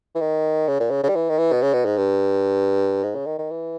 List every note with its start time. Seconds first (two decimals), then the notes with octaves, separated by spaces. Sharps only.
0.15 E3
0.21 D#3
0.68 C#3
0.80 A#2
0.91 C#3
1.03 C#3
1.09 G3
1.15 E3
1.29 D#3
1.38 E3
1.52 B2
1.62 C#3
1.73 B2
1.85 G#2
1.97 G2
3.03 G#2
3.15 C#3
3.26 D#3
3.38 D#3
3.50 E3